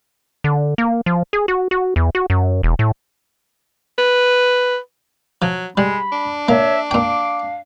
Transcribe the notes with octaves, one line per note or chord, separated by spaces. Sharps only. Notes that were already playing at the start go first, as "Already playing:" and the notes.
D3
A#3
F3
G#4
F#4
F#4
E2
F#4
F#2
E1
A2
B4
F3 F#3
G3 G#3 B5
D4
A#3 C#5 E5
A#2 F5 G5 D6